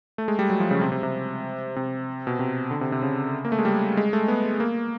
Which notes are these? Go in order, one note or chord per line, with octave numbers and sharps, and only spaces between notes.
A3
G#3
G3
F#3
F3
C#3
C3
C3
C3
C3
B2
C3
D3
C3
C3
C#3
A#3
A3
G#3
G3
G#3
A3
B3
A#3